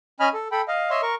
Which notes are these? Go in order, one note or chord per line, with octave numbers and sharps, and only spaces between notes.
C#4 D#5 G#5 B5 F6
A4
A4 G5 B5
D#5 F5
C#5 D#5 E5 C6
A#4 C#6